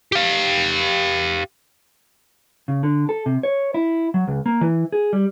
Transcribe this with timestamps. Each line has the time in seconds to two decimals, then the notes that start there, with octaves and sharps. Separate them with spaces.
0.12 G4 F5
2.68 C#3
2.83 D3
3.09 A4
3.26 C3
3.43 C#5
3.74 E4
4.14 F#3
4.28 C#2
4.46 A#3
4.61 E3
4.92 G#4
5.13 G3